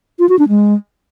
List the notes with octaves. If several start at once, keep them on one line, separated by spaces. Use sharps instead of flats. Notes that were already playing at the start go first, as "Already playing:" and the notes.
F4
F#4
D4
G#3